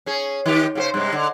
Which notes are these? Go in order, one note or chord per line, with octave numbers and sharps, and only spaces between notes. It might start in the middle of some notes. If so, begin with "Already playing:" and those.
C#4 G#4
D#3 G4
C#3 G4 C5
G2 C3 G#3
D3